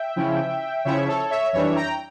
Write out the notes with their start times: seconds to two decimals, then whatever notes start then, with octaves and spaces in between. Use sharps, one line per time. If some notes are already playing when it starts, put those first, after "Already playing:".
Already playing: E5 G5
0.16 C#3 F3 C#4 E4
0.85 C#3 F3 C#4 E4 C#5 E5
1.08 A4 C#5
1.30 C#5 E5
1.52 F2 E3 G3 D4 C#5 E5
1.76 G5 A#5